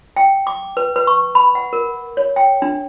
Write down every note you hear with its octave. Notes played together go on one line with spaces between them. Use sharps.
G5
D6
B4
B4
C#6
B5
F#5
A#4
C#5
G5
D4